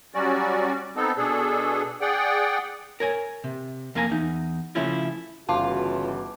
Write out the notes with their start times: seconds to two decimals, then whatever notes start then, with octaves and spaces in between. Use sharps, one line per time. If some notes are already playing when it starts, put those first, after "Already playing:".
0.14 F#3 G3 C#4 F#4 D5
0.96 B3 C4 D#4 A4
1.17 B2 D4 G#4 A4
2.01 G#4 D5 F#5 G5
3.00 A#4 C#5 G#5
3.44 C3
3.95 F2 A#3 F5 G#5 A#5
4.10 E2 D#4
4.75 C#3 F3 A3 C#4 E4 F4
5.49 G1 C#3 E3 F4 F#4 A5 D6